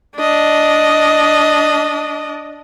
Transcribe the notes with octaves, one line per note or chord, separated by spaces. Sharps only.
D4 D#5